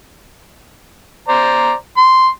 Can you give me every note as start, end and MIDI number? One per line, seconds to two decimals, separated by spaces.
1.28 1.74 72
1.28 1.74 74
1.28 1.74 82
1.97 2.28 84